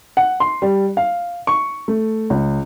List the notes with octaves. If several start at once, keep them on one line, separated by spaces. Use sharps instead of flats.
F#5
C6
G3
F5
C#6
A3
C#2